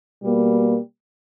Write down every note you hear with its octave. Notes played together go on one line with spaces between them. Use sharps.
B2 G3 A#3